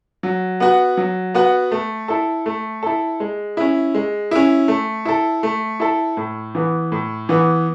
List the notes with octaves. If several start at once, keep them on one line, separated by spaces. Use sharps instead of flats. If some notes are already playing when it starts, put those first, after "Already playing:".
F#3
B3 F#4
F#3
B3 F#4
A3
E4 A4
A3
E4 A4
G#3
C#4 E4
G#3
C#4 E4
A3
E4 A4
A3
E4 A4
A2
E3 B3
A2
E3 B3